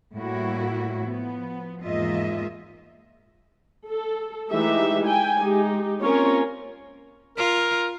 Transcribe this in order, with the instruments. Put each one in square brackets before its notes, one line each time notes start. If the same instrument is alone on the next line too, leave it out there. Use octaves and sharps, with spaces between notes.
[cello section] A2 G3 A#3 E4 F#4
F3 B3
E2 G#2 A#3 F4 D#5 E5
[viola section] A4
E3 G#3 A3 D#4 G4 E5
G5 G#5
G#3 D#4 G4
A#3 C4 C#4 F4 A#4 C#5
[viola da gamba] F4 [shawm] A#4